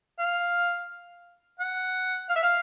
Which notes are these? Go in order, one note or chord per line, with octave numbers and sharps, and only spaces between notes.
F5
F#5
F5
E5
F5